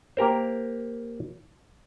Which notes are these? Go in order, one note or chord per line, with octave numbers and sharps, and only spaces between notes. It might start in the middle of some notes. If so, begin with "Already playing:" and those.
A#3 G4 A#4 C5